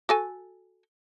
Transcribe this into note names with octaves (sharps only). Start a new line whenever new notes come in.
F#4 A4 G#5